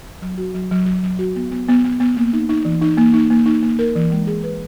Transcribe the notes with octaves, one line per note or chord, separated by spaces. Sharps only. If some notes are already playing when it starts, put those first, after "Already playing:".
F#3
F#4
F#3
F#3
F#3
F#3
F#4
B3
B3
B3
B3
B3
A#3
D#4
D#4
E3
D#4
A#3
D#4
A#3
D#4
A#3
A#4
E3
G#3
G#4
B4